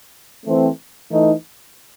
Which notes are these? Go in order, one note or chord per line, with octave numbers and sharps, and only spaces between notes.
E3 A3 C4
E3 A3 D#4